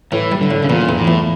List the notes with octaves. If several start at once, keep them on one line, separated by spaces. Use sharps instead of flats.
A2 E3
G3
D3
A2
C#3
E2 A#2
E2
A2
E2